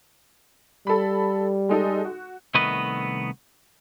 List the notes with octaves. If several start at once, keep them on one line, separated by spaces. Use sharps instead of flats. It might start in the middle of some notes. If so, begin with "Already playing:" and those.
G3 A4 B5
G#3 D#4 A4
F#4
C2 D#3 A3 B3 B4 D#5